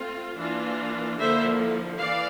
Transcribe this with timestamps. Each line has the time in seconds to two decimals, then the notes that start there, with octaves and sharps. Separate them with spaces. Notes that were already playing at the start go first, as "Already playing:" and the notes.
Already playing: A3 C4 F4
0.35 E3 A#3 D4 F4
1.17 D3 F3 A#3 E4 C5 E5
1.99 E3 D5 F5